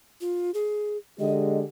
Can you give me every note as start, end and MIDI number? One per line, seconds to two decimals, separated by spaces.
0.21 0.51 65
0.54 0.97 68
1.19 1.62 50
1.19 1.62 56
1.19 1.62 67
1.19 1.58 75